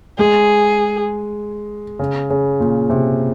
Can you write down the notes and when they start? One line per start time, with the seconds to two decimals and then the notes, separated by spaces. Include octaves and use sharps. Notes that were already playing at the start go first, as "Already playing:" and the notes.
0.18 G#3 G#4
1.99 C#3
2.30 C#3
2.60 A#2
2.90 C3